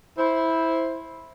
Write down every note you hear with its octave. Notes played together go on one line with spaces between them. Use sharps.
E4 C5